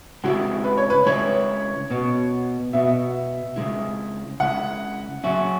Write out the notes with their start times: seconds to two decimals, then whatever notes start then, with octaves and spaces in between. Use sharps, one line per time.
0.24 C#3 G#3 E4 F#4
0.64 B4
0.78 C#5
0.90 B4
1.06 C#3 G#3 E4 C#5
1.90 B2 B3 F#4
2.73 B2 B3 F#4 E5
3.56 C#3 G#3 E4
4.40 C#3 G#3 E4 F#5
5.23 C#3 F#3 C#4 F#4 E5